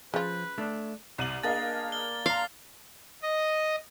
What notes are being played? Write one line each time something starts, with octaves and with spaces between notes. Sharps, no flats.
C#3 F3 F4 B4
A3 D4
C2 D5 D#7 F#7
A#3 D4 G#4 A#4 D#5 F5 A6
G7
F5 A#5 C6 C7 G7
D#5